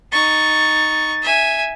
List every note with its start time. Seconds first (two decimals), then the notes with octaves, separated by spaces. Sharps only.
0.12 D#4 C#6 A6
1.22 E5 G#5